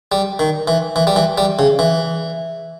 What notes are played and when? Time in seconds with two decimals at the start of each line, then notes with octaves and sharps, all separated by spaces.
0.12 G3
0.39 D#3
0.68 E3
0.96 E3
1.07 G3
1.16 E3
1.38 G3
1.59 C#3
1.79 E3